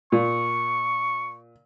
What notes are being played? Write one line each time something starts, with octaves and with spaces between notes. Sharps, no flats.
A#2 C#6